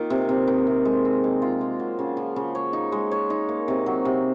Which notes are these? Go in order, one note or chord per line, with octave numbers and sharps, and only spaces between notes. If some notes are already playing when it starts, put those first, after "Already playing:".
Already playing: D#3 A#3 F4
C3
C3
D#3
C3
G#3
C4
G#3
F4
A#3
F#3
C#3
F3
C#3
C#5
D#4
G#3
C#5
D#4
A#3
C3
F#3
C3